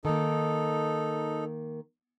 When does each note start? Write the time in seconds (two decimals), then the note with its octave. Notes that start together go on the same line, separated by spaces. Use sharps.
0.05 D#3 A#3 D#4 A4